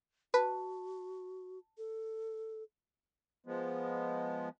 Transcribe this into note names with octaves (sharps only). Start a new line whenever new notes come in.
F#4 B4 A5
A4
F3 G#3 B3